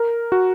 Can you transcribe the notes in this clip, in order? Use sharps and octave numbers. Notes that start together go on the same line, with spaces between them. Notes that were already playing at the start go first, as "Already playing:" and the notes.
Already playing: A#4
F#4